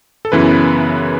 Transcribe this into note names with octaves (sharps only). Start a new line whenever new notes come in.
A4
F#2 C#3 E3 B3 E4 B4